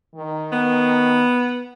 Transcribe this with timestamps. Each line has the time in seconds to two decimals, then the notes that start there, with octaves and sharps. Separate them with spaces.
0.15 D#3
0.52 B3